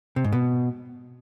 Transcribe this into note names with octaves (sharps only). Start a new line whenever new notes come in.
C3
G#2
B2